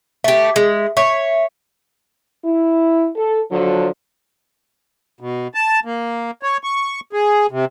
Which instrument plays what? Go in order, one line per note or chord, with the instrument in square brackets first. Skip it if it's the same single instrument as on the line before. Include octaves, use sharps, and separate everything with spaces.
[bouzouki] A3 G4 [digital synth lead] E5
[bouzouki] G#3
[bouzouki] C#5 [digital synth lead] E5
[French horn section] E4
A4
D3 F3 F#3
[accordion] B2
A5
A#3
C#5
C#6
G#4
C3